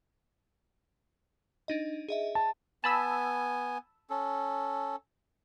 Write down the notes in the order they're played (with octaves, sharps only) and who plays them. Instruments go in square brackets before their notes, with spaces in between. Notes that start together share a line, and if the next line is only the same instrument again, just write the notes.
[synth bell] D4 D#4 D#5
G#4 D#5 E5
[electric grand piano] A5
[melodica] B3 G#5 [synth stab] A5 B5 E6
[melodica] C#4 A4